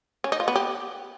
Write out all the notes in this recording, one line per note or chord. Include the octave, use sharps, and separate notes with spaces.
C#4
D#4
F4
B3
G4